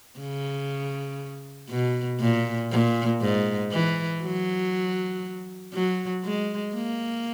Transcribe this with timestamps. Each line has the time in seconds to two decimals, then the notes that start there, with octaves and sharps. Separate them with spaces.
0.19 C#3
1.70 B2
2.20 A#2
2.71 A#2
3.21 G#2
3.72 E3
4.23 F#3
5.73 F#3
6.24 G#3
6.74 A#3